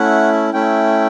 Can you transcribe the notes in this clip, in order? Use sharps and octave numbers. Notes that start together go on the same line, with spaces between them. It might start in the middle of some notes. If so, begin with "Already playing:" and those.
Already playing: A3 C#4 E4 F#5
A3 C#4 E4 G5